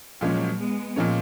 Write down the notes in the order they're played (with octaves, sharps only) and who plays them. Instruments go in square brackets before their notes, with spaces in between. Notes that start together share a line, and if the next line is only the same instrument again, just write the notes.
[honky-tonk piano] A#2 F3 G#3 C#4 [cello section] F#3 A#3
[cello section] G#3 B3
[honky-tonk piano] A#2 F3 G#3 C#4